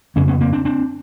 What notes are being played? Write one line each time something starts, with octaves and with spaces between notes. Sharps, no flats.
F2 C#3 B3 C#4
B3 C#4
A#3 C4
C4 D4
C4 D4